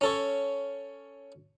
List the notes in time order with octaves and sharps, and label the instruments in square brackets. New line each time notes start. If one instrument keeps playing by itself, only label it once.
[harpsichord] C#4 A4 C#5